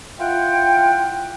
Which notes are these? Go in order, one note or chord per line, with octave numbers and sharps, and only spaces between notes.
E4 F4 F#5 G5